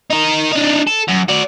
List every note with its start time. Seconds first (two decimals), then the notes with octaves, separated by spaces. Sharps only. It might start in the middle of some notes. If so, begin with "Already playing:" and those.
0.11 D#4 A#4
0.52 D4 D#4
0.87 A4
1.08 F#2
1.29 F#4 D5